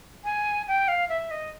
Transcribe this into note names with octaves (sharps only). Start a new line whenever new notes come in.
G#5
G5
F5
E5
D#5